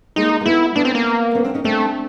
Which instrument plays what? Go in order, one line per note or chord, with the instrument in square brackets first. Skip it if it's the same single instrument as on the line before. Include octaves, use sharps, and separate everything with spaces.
[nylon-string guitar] G#3 A#3 [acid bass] D#4
[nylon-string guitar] A#3
[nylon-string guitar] A3 B3 [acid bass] E4
[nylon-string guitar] A3 B3 [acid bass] D4
[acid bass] C4
A#3
[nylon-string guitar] B3 C#4
C4 D4
C#4 D#4
[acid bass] A3 [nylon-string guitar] C4 D4